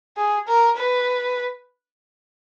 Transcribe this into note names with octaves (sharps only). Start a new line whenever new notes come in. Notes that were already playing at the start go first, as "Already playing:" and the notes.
G#4
A#4
B4